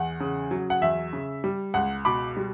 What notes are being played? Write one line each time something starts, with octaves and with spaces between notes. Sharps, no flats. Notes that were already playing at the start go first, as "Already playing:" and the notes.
Already playing: E2 F#5
C#3
F#3
F#5
E2 E5
C#3
G3
C#2 F#5
B2 B5 D6
G3